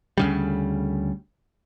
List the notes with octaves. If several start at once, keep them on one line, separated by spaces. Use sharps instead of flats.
D2 C#3 G3